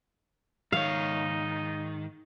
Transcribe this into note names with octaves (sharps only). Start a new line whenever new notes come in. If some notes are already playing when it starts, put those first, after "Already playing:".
G#2 D#3 D#4 C#5 F5